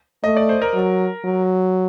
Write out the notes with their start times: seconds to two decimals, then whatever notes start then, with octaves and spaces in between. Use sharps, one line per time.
0.23 A3 D#5
0.37 D5
0.49 C5
0.62 A#4
0.74 F#3
1.25 F#3